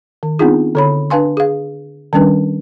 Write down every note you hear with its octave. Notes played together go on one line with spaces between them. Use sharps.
D#3
B3 C4 D4 D#4 F4 G#4
D3 C#5 B5
D4 B4 F5 G#5 C6
G#4 F5
D#3 G3 C#4 D4 B4